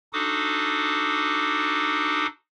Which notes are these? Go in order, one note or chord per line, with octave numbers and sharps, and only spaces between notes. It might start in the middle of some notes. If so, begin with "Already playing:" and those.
D4 D#4 F#4 A4 D6 D#6